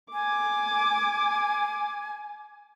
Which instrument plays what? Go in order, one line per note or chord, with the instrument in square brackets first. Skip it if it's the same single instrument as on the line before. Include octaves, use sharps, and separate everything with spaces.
[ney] G#5 [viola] D6